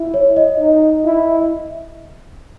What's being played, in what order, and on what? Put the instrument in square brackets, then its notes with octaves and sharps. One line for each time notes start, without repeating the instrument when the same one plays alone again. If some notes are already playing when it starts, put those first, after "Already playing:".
Already playing: [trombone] E4
[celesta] C#5
D#5
[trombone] D#4
E4
[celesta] E5